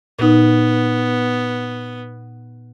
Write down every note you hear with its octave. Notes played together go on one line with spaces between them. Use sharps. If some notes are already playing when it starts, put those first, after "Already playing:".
A#2 B3 D#4